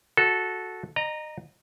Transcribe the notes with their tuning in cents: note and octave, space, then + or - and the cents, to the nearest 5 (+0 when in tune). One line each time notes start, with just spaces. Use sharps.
F#4 -10 A4 -10
D#5 -30 A#5 +0